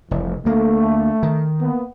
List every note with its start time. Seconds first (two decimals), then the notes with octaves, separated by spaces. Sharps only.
0.11 F1 C2 E3
0.45 D2 A3 A#3
1.23 D#3
1.62 A#3 B3